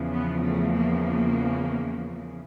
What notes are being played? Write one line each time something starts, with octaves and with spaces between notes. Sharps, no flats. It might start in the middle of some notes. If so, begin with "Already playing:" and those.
Already playing: E2 C#3 F3
B3
A3
A#3